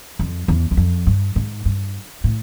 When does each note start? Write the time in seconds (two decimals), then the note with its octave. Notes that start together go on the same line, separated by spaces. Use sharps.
0.19 F2
0.48 E2
0.71 E2
0.77 F2
1.07 G2
1.36 G#2
1.65 G2
2.24 A2